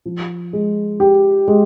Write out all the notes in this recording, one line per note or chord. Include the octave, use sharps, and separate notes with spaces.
F3
G#3
G4
G#3